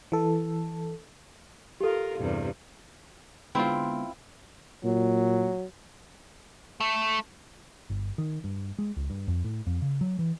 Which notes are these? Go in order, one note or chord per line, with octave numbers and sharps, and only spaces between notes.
E3 A4
F4 G4 A4 A#4
E2 G2 C3
D3 G#3 B3 C4 E4 F4
A#2 F#3
A3
G1
D#3
G2
G#3
C#2
G2
F2
A2
F2
C#3
F#3
E3